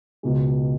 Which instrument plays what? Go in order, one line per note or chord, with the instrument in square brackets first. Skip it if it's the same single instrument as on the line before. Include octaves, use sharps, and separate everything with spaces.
[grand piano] C#2 B2 G#3